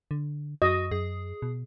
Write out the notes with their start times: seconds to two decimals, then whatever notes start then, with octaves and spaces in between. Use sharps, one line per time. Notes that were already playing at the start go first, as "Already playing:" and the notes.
0.11 D3
0.62 F#2 F#4 D#5
0.91 F#2 G#4
1.42 B2